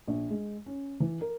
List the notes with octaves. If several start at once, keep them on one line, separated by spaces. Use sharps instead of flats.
A#1
G#3
C#4
E3
A#4